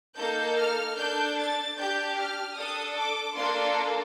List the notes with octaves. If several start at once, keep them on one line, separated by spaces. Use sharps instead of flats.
A#3 D#4 A4 G6
F6
D4 A4 G6
A6
D4 G4 G6
F6
D4 A4 D#6
D6
A#3 D4 F4 A4 C6